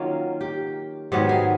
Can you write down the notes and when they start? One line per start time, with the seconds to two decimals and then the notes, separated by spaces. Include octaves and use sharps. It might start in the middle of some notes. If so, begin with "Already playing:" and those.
Already playing: D#3 F#3 A#3 C#4 F4
0.41 G4
1.12 G#2 D#3 F#3 B3 G4
1.29 G#4